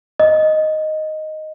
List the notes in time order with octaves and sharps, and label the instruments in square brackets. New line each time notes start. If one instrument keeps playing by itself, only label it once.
[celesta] D#5